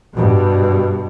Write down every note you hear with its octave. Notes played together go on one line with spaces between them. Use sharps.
G2 B2